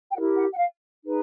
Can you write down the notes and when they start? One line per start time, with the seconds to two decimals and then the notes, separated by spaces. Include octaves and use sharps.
0.10 G5
0.15 E4 G4 A#4 F#5
0.37 F#5
0.52 F#5
0.58 F5
1.04 D#4 G#4 B4